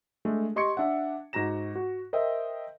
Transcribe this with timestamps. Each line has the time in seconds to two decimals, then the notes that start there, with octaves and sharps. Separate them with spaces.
0.25 G#3 A3 D4
0.56 G4 D#5 C6 C#6 G#6 C#7
0.77 D4 E5 F#5
1.33 G#2 F#4 A#5 A#6 E7
1.75 F#4
2.13 A#4 C5 D#5 E5 G5